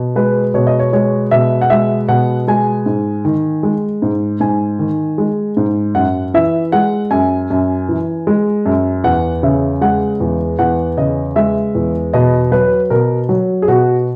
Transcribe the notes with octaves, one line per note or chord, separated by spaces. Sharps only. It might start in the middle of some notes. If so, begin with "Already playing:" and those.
Already playing: B2
G#3 B4
B2 C#5
D#5
C#5
G#3 C#5
B2 E5
F#5
G#3 E5
B2 F#5
G#3 G#5
G#2
D#3
G#3
G#2
G#2 G#5
D#3
G#3
G#2
F#2 F#5
E3 E5
G#3 F#5
F#2 G#5
F#2
E3
G#3
F#2
E2 F#5
C#3 E5
G#3 F#5
E2
E2 F#5
C#3 D#5
G#3 E5
E2
B2 D#5
F#3 B4
B2 A#4
F#3
G#4
B2 F#4